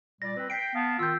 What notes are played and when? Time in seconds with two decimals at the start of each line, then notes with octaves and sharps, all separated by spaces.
0.22 A#2 G3 D5 A#6
0.37 C4 B4
0.50 G5 B6 C7 D7
0.75 B3 F5 A5
0.99 D#3 F4 E6 G6